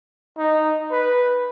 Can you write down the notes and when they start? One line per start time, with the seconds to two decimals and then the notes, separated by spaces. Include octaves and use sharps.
0.37 D#4
0.91 B4